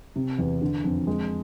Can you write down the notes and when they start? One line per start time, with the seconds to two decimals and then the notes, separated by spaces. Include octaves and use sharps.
0.16 C3
0.38 E2
0.61 D3
0.84 F2
1.07 G#3